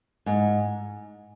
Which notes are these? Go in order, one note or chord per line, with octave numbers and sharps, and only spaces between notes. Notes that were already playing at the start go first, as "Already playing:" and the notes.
G#2